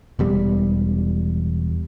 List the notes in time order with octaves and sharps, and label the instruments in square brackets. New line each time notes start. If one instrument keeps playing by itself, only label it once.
[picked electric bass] E1 E2 G3